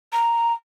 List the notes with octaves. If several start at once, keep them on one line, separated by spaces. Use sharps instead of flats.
A#5